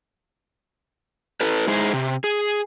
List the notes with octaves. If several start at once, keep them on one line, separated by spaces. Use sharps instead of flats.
E4 A4 B4
G#3 D#4 E4 G#4 C5
C3
G#4